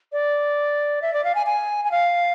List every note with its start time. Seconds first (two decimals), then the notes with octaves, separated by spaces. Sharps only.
0.13 D5
1.02 E5
1.14 D5
1.24 F5
1.35 G#5
1.46 G#5
1.85 G#5
1.91 F5